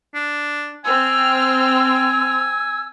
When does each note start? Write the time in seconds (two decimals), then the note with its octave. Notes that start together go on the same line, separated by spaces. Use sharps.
0.15 D4
0.85 C4 G#5 E6 F6